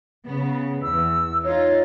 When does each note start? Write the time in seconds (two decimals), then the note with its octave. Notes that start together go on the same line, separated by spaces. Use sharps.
0.25 C#3 B3
0.82 E2 E6
1.44 D#4 F4 C#5